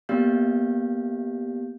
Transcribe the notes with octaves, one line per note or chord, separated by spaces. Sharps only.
A#3 B3 G4 D5 F5 G6